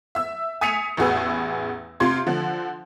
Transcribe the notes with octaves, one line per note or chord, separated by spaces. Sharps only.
E5 E6
G#5 D#6 B6 C#7 D#7 F7
A1 E2 F#4 G#4 B4 E6
C3 F4 C6 G#6
D3 F3